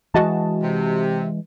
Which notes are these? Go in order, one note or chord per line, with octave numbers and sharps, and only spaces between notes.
E3 G#3 F#4 D#5 A5
C3